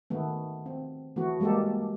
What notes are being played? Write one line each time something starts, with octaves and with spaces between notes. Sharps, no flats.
D#3 A3 B3
C4
E3 A3 B3 F#4
G3 G#3 A#3 G4 A4